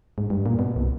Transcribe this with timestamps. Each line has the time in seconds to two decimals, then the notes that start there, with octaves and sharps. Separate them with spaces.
0.18 G#2
0.30 G2
0.46 A#2
0.59 B2
0.76 C2